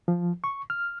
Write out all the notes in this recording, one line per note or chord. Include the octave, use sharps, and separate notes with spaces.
F3
C#6
F6